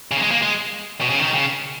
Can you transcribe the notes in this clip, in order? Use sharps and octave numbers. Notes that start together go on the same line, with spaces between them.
C#3
A#3
G#3
A#3
G#3
B2
C#3
D#3
C#3